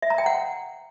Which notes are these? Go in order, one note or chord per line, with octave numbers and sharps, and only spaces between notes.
E5
A#5
G5
F#5